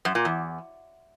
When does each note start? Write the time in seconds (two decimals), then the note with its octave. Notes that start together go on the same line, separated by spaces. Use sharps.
0.05 F#2
0.15 A#2
0.25 E2